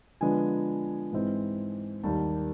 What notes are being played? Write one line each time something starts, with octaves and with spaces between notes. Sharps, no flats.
D3 F3 G#3 B3 D4 G#5
G#2 E3 G#3 C4
D#2 D#3 G3 A#3 A5